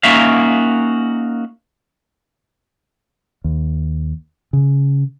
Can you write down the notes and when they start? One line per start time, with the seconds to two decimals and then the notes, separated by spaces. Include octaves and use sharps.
0.03 A#3 C#4 D#4 F#4 E5 F5
3.44 D#2
4.53 C#3